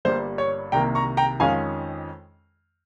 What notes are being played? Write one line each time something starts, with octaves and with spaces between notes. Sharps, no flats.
G1 G2 G3 A#3 C5
C#5
C2 C3 D#3 A#3 G5 A#5
A#5 C#6
G5 A#5
F2 D#3 G#3 C#4 F4 F5 G#5